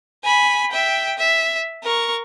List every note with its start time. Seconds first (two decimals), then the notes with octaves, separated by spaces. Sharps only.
0.24 G#5 B5
0.72 E5 G5
1.18 E5
1.84 A#4 C#6